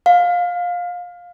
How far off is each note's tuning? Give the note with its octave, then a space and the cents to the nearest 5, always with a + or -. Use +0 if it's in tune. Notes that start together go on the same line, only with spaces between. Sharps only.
F5 +20